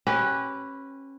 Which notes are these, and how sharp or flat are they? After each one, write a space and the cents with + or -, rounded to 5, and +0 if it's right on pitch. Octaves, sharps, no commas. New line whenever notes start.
C#4 -25 G4 -30 B4 +0